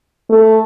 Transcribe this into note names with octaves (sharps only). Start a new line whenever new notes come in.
A3